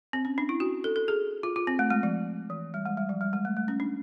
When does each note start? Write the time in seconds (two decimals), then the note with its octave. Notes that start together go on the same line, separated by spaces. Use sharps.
0.13 C4
0.25 C#4
0.38 D4
0.49 E4
0.60 F#4
0.84 A4
0.96 A4
1.08 G#4
1.43 F4
1.56 F4
1.67 C4
1.79 A3
1.90 G#3
2.03 F3
2.50 E3
2.74 G3
2.85 G#3
2.97 G3
3.09 F3
3.21 G3
3.33 G#3
3.45 A3
3.57 A3
3.68 C#4
3.80 D4